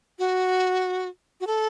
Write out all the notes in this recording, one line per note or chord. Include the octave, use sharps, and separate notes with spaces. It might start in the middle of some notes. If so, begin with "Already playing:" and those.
F#4
F#4
A4